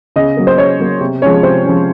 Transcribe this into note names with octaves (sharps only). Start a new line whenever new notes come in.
C#3 D#5
F#3 A#3
C5
C#3 C#5
F#3 A#3
C3
F3 G#3 C#4 C#5
C3 C5
F3 G#3 C#4